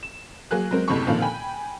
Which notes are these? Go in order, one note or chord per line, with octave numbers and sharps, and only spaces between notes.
E7
F#3 A#3 G#4 F#6
F#3 G#3 C4 A#4
F#1 D2 C3 E4 B5 C#6
A#2 D3 D#3 F3 C4 F4
G5 G#5 B5